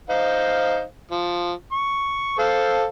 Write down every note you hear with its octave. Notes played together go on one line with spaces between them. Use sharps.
D#4 C5 F5
F3
C#6
A4 C5 F5